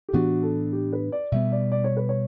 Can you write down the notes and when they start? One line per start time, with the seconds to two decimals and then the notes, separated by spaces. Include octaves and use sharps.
0.09 G4
0.13 A2 E3 B3 D4 F#4
0.43 A4
0.73 G4
0.93 B4
1.12 D5
1.32 B2 G3 B3 E5
1.52 D5
1.72 D5
1.84 C#5
1.97 B4
2.09 C#5